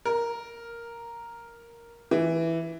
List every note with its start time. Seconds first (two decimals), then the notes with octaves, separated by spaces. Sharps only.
0.05 A#4
2.11 E3